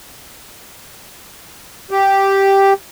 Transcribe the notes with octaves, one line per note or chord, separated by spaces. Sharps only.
G4